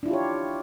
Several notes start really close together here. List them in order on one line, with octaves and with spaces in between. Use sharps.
D4 E4 F4 G4 C#5